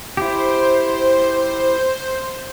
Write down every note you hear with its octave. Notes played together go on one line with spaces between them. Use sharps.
E4 G4 C5